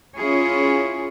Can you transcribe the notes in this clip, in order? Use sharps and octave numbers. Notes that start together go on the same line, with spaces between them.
C#4 E4 F4 G#4 C#5